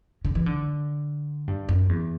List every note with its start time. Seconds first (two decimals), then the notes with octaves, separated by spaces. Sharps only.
0.25 D3
0.35 E3
0.46 D3
1.48 G2
1.69 F#2
1.89 E2